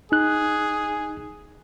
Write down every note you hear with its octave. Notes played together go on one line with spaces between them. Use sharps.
D#4 G#4 F#6